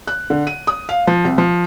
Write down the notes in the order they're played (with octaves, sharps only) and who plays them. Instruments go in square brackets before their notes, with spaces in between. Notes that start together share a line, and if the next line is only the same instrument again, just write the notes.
[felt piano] F#6
D3
D#7
D#6
F5
F3
C2
F3